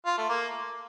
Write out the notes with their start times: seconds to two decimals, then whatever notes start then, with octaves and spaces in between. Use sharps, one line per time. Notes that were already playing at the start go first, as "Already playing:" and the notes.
0.06 F4
0.17 A3
0.29 A#3